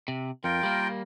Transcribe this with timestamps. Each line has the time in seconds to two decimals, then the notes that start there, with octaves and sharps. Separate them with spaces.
0.08 C3
0.44 F2 F4 A#4 G5
0.63 G3 A#3